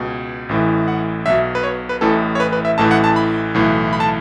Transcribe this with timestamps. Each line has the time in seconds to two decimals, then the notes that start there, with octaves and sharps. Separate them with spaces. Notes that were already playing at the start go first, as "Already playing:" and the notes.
Already playing: C#2 B2
0.49 A1 A2 E3
0.88 F#5
1.26 B1 B2 E5
1.55 B4
1.64 C#5
1.89 B4
2.01 A1 A2 E3 A4
2.35 C#5
2.40 B4
2.53 B4
2.65 E5
2.78 A1 A2 E3 A5
2.91 F#5
3.04 A5
3.16 B5
3.54 B1 A2 E3
3.93 B5
4.00 A5